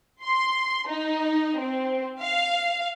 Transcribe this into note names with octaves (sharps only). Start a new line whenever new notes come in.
C6
D#4
C4
F5